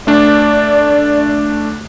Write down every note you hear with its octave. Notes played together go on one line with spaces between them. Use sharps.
A3 D4 D5